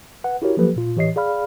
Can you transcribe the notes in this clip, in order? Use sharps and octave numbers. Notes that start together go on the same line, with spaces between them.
B4 F#5
E4 F#4 G4 A#4 C#5
F3 F#3 A#3 G4 A4 B4
A#2 F4
A2 E3 G4 C#5 D#5 C7
G#4 D5 F5 B5 F6